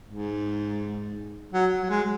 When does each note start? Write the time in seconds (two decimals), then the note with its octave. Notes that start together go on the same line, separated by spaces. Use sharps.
0.08 G#2
1.53 F#3
1.83 F#3
1.90 G#3